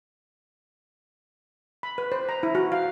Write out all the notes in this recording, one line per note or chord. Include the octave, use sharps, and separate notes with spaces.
B5
B4
C5
A#5
E4
F#4
F5